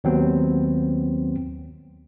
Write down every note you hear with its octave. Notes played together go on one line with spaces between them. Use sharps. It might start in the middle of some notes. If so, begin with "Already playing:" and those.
D#2 F#3 B3 C4